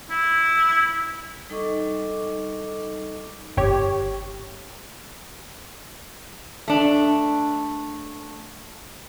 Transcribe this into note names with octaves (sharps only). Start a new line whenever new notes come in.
E4
G3 D#4 A4 D#5 C#6 D6
G1 G4 C#5
A3 D4